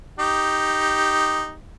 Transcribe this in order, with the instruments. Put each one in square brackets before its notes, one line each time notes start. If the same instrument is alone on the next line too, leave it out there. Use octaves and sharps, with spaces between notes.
[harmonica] D#4 G4